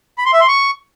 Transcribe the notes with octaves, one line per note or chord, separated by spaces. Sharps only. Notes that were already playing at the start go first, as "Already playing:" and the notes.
B5
C6
E5
C6
C#6